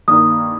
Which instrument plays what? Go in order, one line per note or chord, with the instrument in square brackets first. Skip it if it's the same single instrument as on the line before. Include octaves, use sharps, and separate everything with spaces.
[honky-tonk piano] G2 D#3 A#3 [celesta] D#6